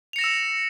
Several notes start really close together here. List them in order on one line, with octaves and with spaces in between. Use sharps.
F7 C#7 A#6 E7 E6